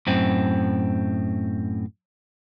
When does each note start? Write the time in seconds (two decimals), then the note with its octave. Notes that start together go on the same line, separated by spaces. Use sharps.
0.07 F#2 A2 C4